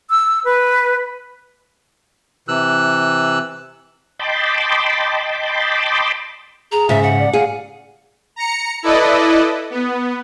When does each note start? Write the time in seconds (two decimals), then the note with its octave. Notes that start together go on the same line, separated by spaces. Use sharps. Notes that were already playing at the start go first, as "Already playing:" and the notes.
0.10 E6
0.44 B4
2.48 C3 E3 E6 F#6
4.19 D#5 G5 A5 B5 C6 D6
6.72 G#4 A#5
6.89 G#2 C#3 E5
7.03 F#5
7.19 D5
7.33 G#4 F5
8.36 A#5 C#7
8.83 E4 A4 B4 D5 D#5
9.70 B3